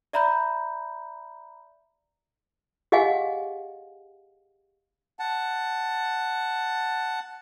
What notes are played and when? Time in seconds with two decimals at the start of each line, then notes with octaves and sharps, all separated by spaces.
0.13 D5 E5 A#5 B5 G6
2.92 G4 G#4 D#5 F5 F#5 G#5
5.19 F#5 A5